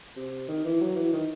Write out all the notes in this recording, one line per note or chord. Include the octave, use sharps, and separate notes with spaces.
C3
D#3
E3
F#3
E3
D#3